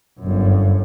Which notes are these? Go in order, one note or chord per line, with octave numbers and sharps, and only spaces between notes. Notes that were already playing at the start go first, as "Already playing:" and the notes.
G1 F#2